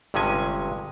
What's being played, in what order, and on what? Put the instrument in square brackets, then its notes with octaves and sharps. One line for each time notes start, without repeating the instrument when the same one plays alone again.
[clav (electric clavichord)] G1 G2 C3 G#3 C#4 G#5